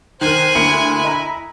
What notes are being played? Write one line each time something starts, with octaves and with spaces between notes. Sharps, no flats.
D#3 A#4 C5 G#5 F#6
D2 A#3 E4 C#7
D#5 A#5